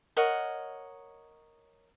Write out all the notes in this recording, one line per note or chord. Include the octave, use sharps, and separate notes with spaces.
A#4 C#5 D#5 F#5